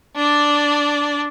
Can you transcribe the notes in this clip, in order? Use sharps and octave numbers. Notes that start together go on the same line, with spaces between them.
D4 D5